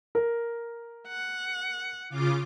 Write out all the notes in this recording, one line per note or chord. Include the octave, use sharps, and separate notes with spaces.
A#4
F#5
C#3 F4 D6